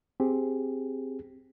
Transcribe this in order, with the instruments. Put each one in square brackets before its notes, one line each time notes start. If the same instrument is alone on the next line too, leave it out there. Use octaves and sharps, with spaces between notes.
[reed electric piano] C4 G4 G#4